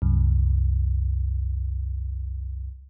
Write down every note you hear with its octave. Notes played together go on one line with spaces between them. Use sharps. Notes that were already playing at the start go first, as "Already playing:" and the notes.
C2 F#2